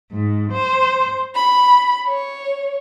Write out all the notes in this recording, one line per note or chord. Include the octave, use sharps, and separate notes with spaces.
G#2
C5
B5
C#5